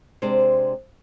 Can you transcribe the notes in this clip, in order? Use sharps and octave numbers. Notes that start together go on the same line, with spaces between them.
C3 G#3 D4 C5 D5